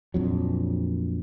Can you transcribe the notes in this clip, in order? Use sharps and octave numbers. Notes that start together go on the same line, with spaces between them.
A#1 F2 F#3